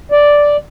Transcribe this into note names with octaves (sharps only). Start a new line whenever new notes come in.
D5